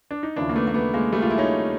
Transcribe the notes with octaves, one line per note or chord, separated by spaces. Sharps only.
D4
D#4
D#2 C#3 F3 D4 E4
A#3
A3 B3
A#3
A3 B3
G#3 A#3
G3 A3
F4
E4
C#4 D#4